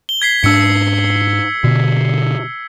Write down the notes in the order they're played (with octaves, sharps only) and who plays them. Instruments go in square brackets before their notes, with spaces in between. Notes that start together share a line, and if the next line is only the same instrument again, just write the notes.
[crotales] G7
G#6 B6 C7
[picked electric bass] G#2 D4 [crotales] E6 C#7
[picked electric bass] B2 D3